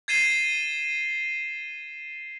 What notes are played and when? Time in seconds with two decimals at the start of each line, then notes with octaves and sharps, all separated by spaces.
0.08 G#6 A6 C7 D#7 E7 G7